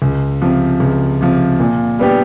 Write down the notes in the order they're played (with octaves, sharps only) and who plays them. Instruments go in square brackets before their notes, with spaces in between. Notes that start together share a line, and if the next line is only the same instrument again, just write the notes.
[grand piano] C#2
C3 F3
C#2
C3 F3
A#2
G3 B3 D4 G4